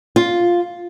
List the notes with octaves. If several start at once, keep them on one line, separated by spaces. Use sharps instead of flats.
F4